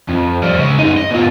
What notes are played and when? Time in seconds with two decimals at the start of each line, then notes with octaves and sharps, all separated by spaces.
0.09 F2
0.43 F3 G3
0.58 C#3 G#3
0.79 F#2 D#4
0.98 D#5
1.11 B2 F4